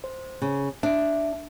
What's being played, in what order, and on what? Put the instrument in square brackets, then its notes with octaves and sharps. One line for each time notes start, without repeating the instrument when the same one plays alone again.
[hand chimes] C5
[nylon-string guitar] C#3
[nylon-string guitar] D4 [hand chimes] E5 D7